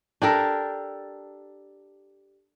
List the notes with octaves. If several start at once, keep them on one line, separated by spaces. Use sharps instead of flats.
D4 G4 A4 A#4